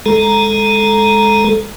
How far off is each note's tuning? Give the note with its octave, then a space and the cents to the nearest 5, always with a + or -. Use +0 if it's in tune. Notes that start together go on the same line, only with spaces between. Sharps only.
G#3 +0 A4 +0 A#5 +0